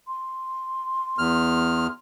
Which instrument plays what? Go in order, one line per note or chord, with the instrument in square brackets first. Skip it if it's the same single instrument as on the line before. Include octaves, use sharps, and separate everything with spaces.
[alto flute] C6
[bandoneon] E2 F6